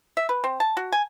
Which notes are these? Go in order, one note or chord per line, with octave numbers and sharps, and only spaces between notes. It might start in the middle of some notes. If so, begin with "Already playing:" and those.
E5
B4
C4
A5
F#4
G#5